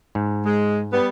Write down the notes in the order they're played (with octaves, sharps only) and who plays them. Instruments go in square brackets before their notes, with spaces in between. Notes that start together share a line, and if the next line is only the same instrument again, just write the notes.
[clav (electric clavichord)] G#2
[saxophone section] G#3
G3 B3